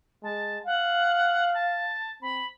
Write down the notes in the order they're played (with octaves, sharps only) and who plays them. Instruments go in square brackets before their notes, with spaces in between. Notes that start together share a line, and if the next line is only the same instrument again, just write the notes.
[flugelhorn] G#3 [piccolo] A5
[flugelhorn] F5 [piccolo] F#5
[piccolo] A5
[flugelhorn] C4 [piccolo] B5